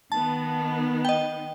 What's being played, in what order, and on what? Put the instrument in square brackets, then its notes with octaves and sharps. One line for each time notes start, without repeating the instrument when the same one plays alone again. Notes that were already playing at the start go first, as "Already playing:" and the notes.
[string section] D#3 B3 [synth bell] A5
[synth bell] D#5 G5